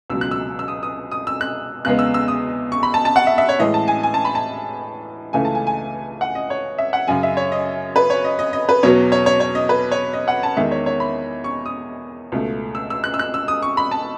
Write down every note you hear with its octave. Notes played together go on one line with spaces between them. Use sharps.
C#2 B2 F#3 E6
F#6
E6
E6
D#6
D#6
D#6
E6
F#6
E2 C#3 G#3 B3 F#6
E6
E6
D#6
C#6
B5
A5
A5
F#5
E5
E5
C#5
A2 E3 G#3 D#5
A5
G#5
G#5
A5
B5
A5
C#2 C#3 E3 A3 G#5
A5
G#5
G#5
F#5
D#5
C#5
E5
F#5
F#2 C#3 F#3 G#5
E5
C#5
D#5
B4
C#5
D#5
D#5
D#5
B4
E2 B2 F#3 B3 C#5
C#5
C#5
C#5
D#5
B4
C#5
D#5
F#5
A5
E2 D#3 G#3 E5
C#5
C#5
B5
C#6
D#6
C#2 B2 A3
E6
E6
F#6
E6
F#6
E6
D#6
C#6
B5
A5